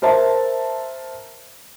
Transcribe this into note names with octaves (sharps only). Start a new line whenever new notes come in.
A#4 C5 E5 A5